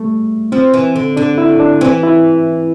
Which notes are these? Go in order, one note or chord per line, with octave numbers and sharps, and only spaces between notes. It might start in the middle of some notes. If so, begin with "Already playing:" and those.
Already playing: G3 A3
F3 C4
E3
D3
D3 D4
E4
D4
E3 C4
E4